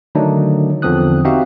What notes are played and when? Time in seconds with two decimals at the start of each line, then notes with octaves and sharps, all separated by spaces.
0.15 D3 D#3 F#3 A3 D4 D#4
0.82 E2 D3 F3 C4 D#6 F#6
1.25 C4 D#4 F#4 G4 E5 F5